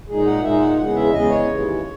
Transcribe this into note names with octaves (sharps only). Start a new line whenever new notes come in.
A#2 G#3 D#4 G#4
F#5
A#2 G#3 D#4 E5
F#5
E2 C#3 G#3 F#5
E5
E2 C#3 G#3 D#5
C#5
D#2 C#3 E3 G#3